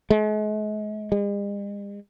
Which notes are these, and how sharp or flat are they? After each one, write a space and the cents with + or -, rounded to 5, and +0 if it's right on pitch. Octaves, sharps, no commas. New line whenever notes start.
G#3 +40
G#3 -45